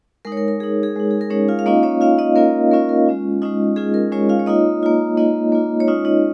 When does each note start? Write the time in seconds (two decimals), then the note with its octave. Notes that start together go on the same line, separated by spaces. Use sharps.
0.25 G#3 D#4 A#4
0.32 C#5
0.37 A#4
0.48 A#4
0.60 G#3 D#4 G#4
0.83 G#4
0.96 G#3 D#4
1.11 G#4
1.21 A#4
1.30 G#3 C#4 D#4 C#5
1.48 F4 F5
1.59 F5
1.66 A#3 C#4 D#4 F4 D#5
1.83 C#4 C#5
2.01 A#3 C#4 F4 F5
2.18 D#4 D#5
2.36 A#3 C#4 F4 A#4
2.71 A#3 C#4 F4 A#4
2.89 A#4
3.06 G#3 C#4 F4
3.42 G#3 C#4 D#4 F4 D#5
3.76 G#3 C#4 F4 G#4
3.94 A#4
4.12 G#3 C#4 F4 C#5
4.29 F4 F5
4.39 C#5
4.46 A#3 D#4 F4 D#5
4.83 A#3 F4
5.17 A#3 D#4 F4 D#5
5.52 A#3 F4
5.80 C#5
5.87 G#3 C#4 D#4 F4 D#5
6.05 D#4 D#5